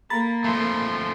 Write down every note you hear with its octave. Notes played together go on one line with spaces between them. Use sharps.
A#3 A#5 B5 A6
F3 A3 C6